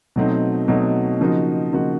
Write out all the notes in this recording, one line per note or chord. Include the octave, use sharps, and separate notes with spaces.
B2 F#3 A3 C4 D#4
B2 F#3 A3 C4 D#4
C#3 F3 A#3 D#4 F#4
C#3 F3 A#3 D#4 F#4